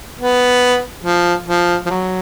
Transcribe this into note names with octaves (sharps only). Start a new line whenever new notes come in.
B3
F3
F3
F3
F#3